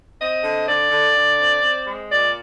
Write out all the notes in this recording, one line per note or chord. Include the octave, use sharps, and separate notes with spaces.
C4 D#5
D3
D3 D5
D3
D3
C4
C4
G#3
A#2 D5